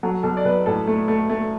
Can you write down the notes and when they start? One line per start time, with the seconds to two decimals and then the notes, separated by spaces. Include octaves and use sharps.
0.03 F#3 A4
0.23 B1 A4
0.37 D5
0.45 B1 B4
0.66 A2 A4
0.87 A3
1.08 A3
1.30 A3